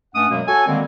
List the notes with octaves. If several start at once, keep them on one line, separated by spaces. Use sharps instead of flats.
G2 A3 C#4 F#5 D#6
F#2 B2 F#3 G#3 A#3
F#4 A4 C#5 G#5
D3 D#3 G3 G#3 A#3 C4